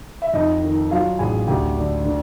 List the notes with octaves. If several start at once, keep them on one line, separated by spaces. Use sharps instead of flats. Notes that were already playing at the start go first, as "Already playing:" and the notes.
E5
F2 D#4 D#5
D#3
F#3 F4 F5
A1 G#4 G#5
D2 G4 G5
D3
D3